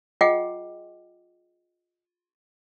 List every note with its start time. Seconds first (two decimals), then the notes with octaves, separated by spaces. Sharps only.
0.21 F4 G#4 D#5 F#5 G5 D6